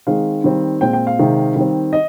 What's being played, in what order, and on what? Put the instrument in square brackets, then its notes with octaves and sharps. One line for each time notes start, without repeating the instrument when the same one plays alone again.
[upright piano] D#3 G#3 C4 F5
D#3 G3 C4
A#2 G#3 C4 G5
G5
F5
C3 D#3 G#3 C4
D#3 G3 C4
D#5